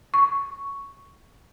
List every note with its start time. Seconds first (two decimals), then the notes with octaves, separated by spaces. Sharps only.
0.14 C#6